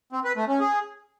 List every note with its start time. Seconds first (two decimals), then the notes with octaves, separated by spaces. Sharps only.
0.12 C4
0.24 B4
0.36 A3
0.48 C#4
0.60 G#4